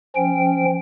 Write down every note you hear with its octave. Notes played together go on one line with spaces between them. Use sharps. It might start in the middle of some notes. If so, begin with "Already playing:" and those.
F3 C#4 G5